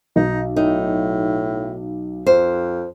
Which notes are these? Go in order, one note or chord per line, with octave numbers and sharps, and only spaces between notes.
B1 D#4
A2 D#4
F2 C5